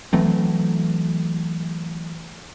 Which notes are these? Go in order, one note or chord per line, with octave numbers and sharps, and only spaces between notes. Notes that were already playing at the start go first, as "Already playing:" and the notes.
E3 F#3 A3 C4